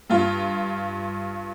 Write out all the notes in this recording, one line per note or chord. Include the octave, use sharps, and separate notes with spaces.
G2 F4